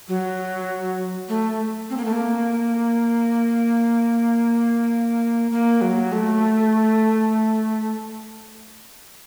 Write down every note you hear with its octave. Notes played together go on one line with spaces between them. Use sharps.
F#3
A3
C4
A#3
A3
A#3
A#3
F#3
A3